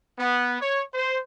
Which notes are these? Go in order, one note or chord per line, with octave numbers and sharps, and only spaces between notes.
B3
C#5
C5